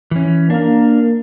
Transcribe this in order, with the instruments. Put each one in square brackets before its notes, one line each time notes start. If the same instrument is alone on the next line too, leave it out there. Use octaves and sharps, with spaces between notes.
[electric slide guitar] E3 C#4
[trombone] A#3 [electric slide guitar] D4 A#4